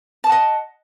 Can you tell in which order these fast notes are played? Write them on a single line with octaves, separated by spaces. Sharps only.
A5 D#6 F#5 D#5